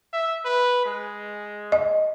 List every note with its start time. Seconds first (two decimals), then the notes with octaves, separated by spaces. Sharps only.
0.13 E5
0.45 B4
0.86 G#3
1.72 D#5